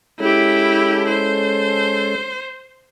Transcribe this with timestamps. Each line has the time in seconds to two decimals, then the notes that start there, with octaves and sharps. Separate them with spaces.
0.20 G#3 C#4 E4 G4 A4
1.09 C5